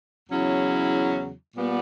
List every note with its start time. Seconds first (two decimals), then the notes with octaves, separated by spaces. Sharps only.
0.29 E2 C#3 F#3 C#4 E4
1.56 A#2 G3 B3